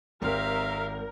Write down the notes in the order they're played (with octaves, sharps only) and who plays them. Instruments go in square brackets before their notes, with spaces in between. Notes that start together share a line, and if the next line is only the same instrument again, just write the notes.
[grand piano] G#1 C4 [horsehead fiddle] G4 E5 [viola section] A#4 [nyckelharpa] F5